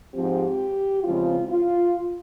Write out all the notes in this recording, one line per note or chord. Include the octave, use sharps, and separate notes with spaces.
G#2 F3 C4 G4
E2 C#3 F3 G#3 C4 F4
F4